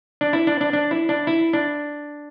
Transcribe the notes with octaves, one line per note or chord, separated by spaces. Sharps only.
D4
E4
D4
D4
D4
E4
D4
E4
D4